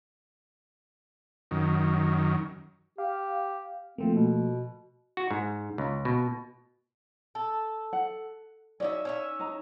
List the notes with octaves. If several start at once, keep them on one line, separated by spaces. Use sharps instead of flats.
F#2 D#3
G4 F5
F3 A3 A#3 C4
B2
F#4
G#2
C#2
B2
A4
F#5
C#4 D#4 F#4 D5 E5
C#4 C#5 E5
D#4 A#5